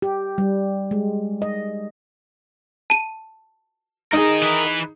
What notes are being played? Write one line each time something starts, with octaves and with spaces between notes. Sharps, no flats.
G4
G3
G#3
D#5
A5 D#7
D#4 G#4 A#4 D#5
E3 B4